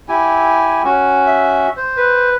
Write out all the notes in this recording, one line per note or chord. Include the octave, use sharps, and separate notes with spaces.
E4 G4 G#5
C#4 F#4
E5
C5
B4